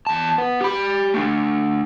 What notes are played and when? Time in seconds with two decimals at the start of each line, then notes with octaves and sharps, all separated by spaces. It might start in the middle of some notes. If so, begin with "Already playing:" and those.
0.07 E2 A5
0.38 B3
0.61 G4 B5
1.14 A3 D4